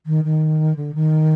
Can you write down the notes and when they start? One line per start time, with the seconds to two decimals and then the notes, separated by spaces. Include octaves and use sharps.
0.06 D#3
0.24 D#3
0.75 D3
0.94 D#3